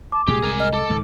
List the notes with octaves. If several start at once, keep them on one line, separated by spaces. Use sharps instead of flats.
A5 D6
C2 A#2 G#3 G4 G#4
C2 G#3 A#4 G#5
D#5 F6
A4 D6
C#2 G#2 D#3